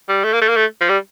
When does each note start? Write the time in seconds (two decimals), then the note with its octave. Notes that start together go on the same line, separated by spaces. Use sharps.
0.09 G3
0.24 A3
0.33 A#3
0.41 A3
0.48 A#3
0.56 A3
0.81 F3
0.89 G3